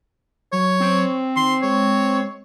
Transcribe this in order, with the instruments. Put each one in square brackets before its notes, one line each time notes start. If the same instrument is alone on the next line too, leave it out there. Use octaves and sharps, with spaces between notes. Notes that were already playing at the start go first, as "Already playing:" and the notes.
[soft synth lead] F#3 [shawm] C#5
[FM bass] C4
[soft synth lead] D#3 [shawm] C6
[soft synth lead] G#3 [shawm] C#5